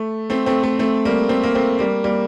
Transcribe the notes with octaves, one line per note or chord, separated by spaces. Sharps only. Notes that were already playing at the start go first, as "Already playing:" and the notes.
Already playing: A3
A3 C4
A3 C4
A3
A3 C4
G3 A#3
A3 C4
A#3
A3 C4
G3 A#3
G3 A#3